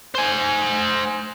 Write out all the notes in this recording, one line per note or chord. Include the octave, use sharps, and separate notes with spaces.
C5 G#5